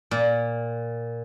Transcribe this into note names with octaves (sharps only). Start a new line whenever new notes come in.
A#2